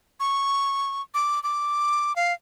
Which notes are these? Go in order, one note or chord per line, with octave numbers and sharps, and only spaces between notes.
C#6
D6
D6
F5